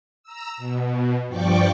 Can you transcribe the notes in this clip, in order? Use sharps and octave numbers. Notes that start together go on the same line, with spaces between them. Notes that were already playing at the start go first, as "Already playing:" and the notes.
A#5 E6
B2
G2 F3 D5 G5 C#6 D6